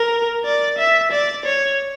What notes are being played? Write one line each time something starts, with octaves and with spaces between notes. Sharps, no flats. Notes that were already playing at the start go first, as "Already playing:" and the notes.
Already playing: A#4
D5
E5
D5
C#5